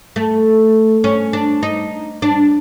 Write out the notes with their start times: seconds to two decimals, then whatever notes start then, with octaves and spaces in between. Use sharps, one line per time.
0.16 A3
1.04 C#4
1.33 D4
1.63 D#4
2.22 D4